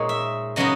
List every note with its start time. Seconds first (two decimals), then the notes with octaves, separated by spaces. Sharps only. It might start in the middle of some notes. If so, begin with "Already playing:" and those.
Already playing: A#2 G#3 D#4 C#5
0.09 E5
0.56 C#3 F#3 B3 D#4 D#5